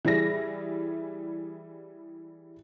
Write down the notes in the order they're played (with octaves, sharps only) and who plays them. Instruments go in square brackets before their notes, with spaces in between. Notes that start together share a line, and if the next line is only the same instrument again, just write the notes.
[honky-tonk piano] E3 G3 E4 G#4 A#6